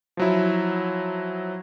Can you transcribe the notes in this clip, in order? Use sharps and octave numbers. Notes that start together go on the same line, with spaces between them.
F3 F#3 E4